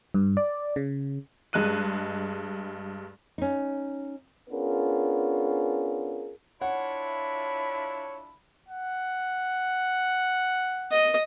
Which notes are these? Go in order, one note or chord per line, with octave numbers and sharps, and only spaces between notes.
G2
D5
C#3
G2 G#3 F#6 D#7
C#4 D#4
B3 C#4 D4 F4 G#4 A#4
D4 E4 F4 C#5 F#5 B5
F#5
D#5